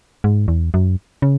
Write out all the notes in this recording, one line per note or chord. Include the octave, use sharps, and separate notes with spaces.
G#2
E2
F#2
C#3